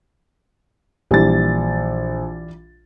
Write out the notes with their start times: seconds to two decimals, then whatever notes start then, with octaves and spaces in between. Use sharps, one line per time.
1.11 A#1 E3 G3 A6